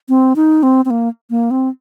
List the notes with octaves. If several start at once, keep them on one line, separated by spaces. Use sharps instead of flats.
C4
D#4
C4
C4
A#3
A#3
C4